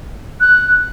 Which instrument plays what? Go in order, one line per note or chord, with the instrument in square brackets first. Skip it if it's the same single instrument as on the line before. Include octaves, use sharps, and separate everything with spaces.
[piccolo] F#6